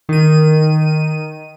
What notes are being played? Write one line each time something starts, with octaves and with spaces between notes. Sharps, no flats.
D#3 D#7